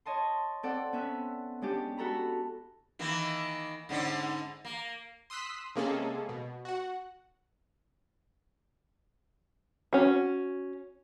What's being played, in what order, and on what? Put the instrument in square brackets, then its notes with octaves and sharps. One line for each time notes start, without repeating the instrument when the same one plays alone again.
[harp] C#5 D#5 A5 C6
C4 A4 D5 F#5
B3 C#4 E5 F#6
G#3 C#4 D4 G4
E4 F#4 A4 A#5 B5
[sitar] D#3 E3 A#3
G#2 D3 C#4
A#3
[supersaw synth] C6 D#6 E6 F#6 B6
C3 G#3 A#3 C#4 G#4 A4
B2
F#4 F#5
[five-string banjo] C#4 F#4